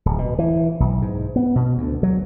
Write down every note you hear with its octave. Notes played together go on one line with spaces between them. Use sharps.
D1
B2
E3
B1
G#2
B3
B2
D2
F#3